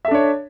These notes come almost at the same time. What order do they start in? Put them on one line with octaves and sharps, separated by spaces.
E5 A4 D4 C#5